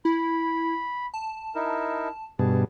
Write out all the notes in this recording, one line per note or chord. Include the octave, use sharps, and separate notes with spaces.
E4 B5
A5
D#4 E4 A#4
G2 B2 G#4 A5